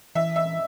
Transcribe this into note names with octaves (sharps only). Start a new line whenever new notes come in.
E3 E5
E5